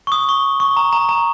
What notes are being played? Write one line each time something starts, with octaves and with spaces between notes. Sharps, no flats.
C#6
D#6
C#6
C#6
A#5
A#5
A#5